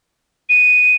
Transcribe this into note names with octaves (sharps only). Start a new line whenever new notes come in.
D#7